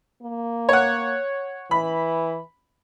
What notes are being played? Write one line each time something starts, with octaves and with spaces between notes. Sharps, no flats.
A#3
C#5 F#5
E3 B5